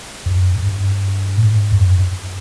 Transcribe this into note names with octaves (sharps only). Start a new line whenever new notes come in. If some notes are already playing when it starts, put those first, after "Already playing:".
F#2
G2
A2
G#2
F#2